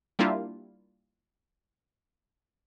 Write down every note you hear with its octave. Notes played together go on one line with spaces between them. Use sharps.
G3 A#3 D4 E4 F4